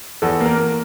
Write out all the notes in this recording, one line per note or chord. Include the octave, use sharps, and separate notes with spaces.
E2 A4
A#3
A#4
A#3